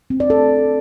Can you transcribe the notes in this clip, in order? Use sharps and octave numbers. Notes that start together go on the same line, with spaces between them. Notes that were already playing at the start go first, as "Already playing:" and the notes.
C4
D5
A4